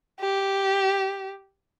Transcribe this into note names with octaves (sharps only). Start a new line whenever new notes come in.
G4